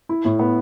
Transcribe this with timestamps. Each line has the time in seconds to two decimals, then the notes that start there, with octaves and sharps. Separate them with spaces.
0.09 E4
0.25 A2
0.39 B3